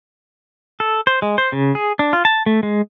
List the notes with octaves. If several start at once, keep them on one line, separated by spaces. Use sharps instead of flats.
A4
C5
G#3
C5
C#3
G#4
D4
F4
A5
A3
G#3